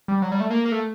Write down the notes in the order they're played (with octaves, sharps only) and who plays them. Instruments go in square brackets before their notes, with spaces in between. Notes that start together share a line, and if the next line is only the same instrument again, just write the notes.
[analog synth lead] G3
F#3
G3
A3
A#3
A#3
A3